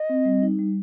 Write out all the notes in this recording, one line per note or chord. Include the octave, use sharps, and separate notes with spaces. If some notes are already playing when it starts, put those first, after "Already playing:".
Already playing: D#5
C4
G3
D#4
G3